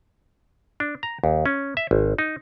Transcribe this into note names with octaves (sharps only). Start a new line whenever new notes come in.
D4
A#5
D#2
C#4
E5
G#1
D#4